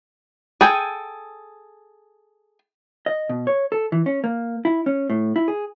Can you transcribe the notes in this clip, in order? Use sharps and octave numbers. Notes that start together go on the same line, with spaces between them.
G#4 A4 G5 G#5
D#5
B2
C#5
A4
E3
C#4
A#3
E4
C#4
A2
E4
G#4